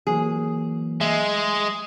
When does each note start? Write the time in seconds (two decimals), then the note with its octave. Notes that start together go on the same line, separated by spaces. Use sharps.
0.07 E3 F#3 A#3 G#4
1.01 G#3 E5